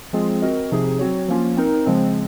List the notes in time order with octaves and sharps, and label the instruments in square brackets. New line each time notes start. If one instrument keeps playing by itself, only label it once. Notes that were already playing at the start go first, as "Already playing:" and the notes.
[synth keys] F3 G#3 C4 F4 G#4
C4 F#4 A#4 D#5
C3 F3 C4 D#4 G#4
F#3 C4 F#4 C#5
F3 A#3 C#4 F4
C4 D#4 A#4
C#3 F3 G#3 C4